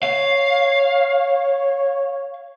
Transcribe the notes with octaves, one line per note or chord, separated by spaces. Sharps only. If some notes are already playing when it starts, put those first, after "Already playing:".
C#5 F5